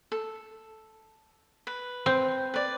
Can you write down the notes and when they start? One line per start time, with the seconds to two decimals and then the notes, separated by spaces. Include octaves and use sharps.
0.12 A4
1.67 B4
2.06 C4
2.54 B4 D5